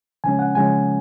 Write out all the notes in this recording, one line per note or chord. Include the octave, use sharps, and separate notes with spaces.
C#3 F3 G#3 C#4 G#5
F#5
C#3 F3 G#3 C#4 G#5